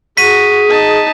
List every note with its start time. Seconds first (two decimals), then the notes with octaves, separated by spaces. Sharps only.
0.17 F#4 G#4 B6 D#7
0.69 D#4 A5